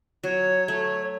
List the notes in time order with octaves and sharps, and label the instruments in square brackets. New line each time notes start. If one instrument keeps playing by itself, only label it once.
[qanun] F#3 [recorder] C#5
[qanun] A3